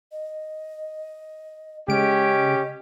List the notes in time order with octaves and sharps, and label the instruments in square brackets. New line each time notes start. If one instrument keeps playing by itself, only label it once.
[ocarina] D#5
[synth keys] C#3 G#3 D7 [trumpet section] C#4 G4 [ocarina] D#5